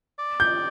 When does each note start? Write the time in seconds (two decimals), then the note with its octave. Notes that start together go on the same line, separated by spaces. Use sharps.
0.19 D5
0.40 G6